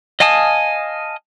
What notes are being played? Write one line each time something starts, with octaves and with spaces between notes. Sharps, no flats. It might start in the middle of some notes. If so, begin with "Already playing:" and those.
D#5 F5 G#5 A5 D#6